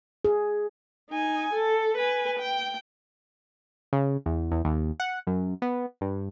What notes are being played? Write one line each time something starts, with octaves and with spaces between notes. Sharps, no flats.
G#4
D#4 G#5
A4
B4 G#5
G5
C#3
E2
E2
D#2
F#5
F#2
B3
G2